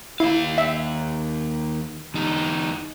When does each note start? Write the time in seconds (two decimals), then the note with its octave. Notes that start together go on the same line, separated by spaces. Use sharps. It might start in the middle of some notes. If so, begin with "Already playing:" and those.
0.20 D#2 E4 F5
0.58 E5
2.14 E2 D#4